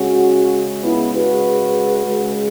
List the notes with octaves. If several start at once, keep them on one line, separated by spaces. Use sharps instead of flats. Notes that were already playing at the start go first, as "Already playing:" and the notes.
Already playing: C#3 G#3 C#4 F#4
B3 E4
F#4 B4
C#3 G#3